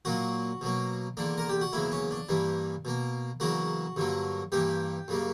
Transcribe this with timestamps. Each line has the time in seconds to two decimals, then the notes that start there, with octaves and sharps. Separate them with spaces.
0.05 A#2 F#3 A#3 F#4
0.61 B2 F#3 A#3
1.17 E2 D3 A#3 D4
1.38 A#4
1.49 G4
1.61 F#4
1.73 E2 C#3 F#3 A#3 E4
1.92 C#4
2.11 D4
2.29 G2 E3 G3 A#3
2.85 B2 A#3
3.40 E2 C#3 F#3 A#3 F#4
3.96 G2 D3 F#3 A#3
4.52 G2 E3 A#3 G4
5.08 F#2 C#3 G3 A#3